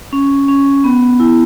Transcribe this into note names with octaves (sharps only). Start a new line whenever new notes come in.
C#4
C#4
B3
E4